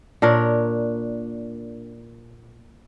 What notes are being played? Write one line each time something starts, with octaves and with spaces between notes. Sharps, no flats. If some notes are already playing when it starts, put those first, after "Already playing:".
A#2 D4 A#4 C#5